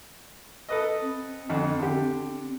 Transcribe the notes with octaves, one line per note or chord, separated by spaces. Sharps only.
A4 B4 D#5
C4
F2 D3
D3 G4